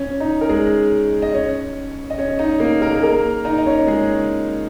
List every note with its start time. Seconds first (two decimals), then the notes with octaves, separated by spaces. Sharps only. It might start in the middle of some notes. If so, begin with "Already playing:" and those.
Already playing: C#4
0.20 D#4
0.41 A#4
0.49 G#3 G#4
1.22 D#5
1.33 C#4 C#5
2.10 D#5
2.18 C#4 C#5
2.39 D#4 D#5
2.60 A#3 A#4
2.81 A#3 A#4
2.92 G#4
3.02 A#3 A#4
3.45 D#4 D#5
3.58 D#5
3.66 C#4 C#5
3.87 G#3 G#4